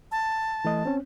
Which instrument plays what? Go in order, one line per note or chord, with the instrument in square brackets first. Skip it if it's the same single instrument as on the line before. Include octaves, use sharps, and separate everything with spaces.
[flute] A5
[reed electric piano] E3 A3 D#5
C4 C#4